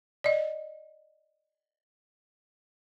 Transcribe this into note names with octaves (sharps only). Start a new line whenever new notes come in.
D5 D#5